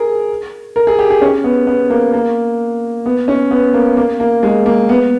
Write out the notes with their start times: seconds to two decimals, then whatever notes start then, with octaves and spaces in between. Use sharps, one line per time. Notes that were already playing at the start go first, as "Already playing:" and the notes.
Already playing: G#4 A#4
0.76 A#4
0.87 G#4
0.99 G4
1.10 G#4
1.21 C#4
1.44 B3
1.67 B3
1.90 A#3
2.13 A#3
3.06 B3
3.28 C#4
3.51 B3
3.74 A#3
3.97 A#3
4.20 A#3
4.43 G#3
4.66 A#3
4.89 B3